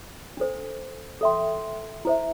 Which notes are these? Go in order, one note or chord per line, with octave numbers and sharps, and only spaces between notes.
D4 A4 C5
A4 E5 G5 C6
E4 C5 E5